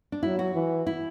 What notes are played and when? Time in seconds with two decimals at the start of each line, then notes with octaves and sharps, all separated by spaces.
0.12 D4
0.23 F#3 E4
0.39 F#4
0.54 E3
0.87 E4